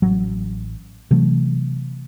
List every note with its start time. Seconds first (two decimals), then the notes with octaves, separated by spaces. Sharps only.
0.02 A1 F#3
1.11 C3 E3 F#3 A3